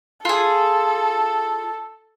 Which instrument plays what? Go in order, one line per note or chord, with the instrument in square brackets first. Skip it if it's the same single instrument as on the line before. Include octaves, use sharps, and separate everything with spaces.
[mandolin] F4 G#4 [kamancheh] A4